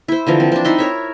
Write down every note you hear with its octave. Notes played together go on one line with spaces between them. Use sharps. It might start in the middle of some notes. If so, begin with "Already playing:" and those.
E4 C5
D3 E3 F3 A#4
C4
C4 D4
D#4 E4 C6
A#4 C#5 E5